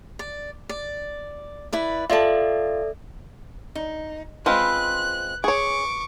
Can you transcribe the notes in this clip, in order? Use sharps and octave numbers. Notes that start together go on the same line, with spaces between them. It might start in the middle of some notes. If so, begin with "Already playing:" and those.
D5
D5
E4 B4 D5
F4 A4 D5 E5 A5
D#4
G#3 C4 F4 B4 F#6
G#4 C#5 C#6 D6